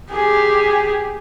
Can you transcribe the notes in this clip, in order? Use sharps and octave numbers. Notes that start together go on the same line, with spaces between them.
G4 G#4